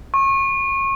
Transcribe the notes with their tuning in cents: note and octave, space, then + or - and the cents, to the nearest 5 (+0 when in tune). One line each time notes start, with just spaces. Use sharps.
C#6 -30